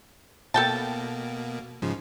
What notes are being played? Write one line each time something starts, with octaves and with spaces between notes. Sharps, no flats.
B2 A#3 A4 G5 A5
G#2 C#3 F3